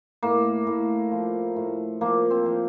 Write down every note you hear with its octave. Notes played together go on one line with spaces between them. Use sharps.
A2 A#3
A2
F3
A2
F3 A#3
C4
F3